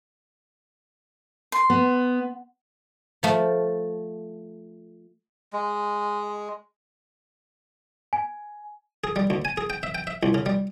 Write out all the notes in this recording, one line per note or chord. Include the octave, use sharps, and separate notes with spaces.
C6
B3
F3 A3
G#3
G#5
G#4
G3
D2
G#5
G#4
G5
E5
G5
E5
C2
C#3
G3